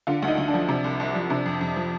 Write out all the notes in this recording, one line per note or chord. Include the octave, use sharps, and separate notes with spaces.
D3 F4
D2
D#4
D2
D4
F3
C3 D4
C2
C2
F3
C3 D4
F2
F2
F3